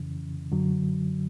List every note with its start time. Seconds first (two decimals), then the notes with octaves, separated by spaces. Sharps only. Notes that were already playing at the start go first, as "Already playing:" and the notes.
Already playing: F2 C#3 E3
0.52 F#2 D3 F#3